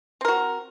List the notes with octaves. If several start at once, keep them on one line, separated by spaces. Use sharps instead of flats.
C4 F#4 A#4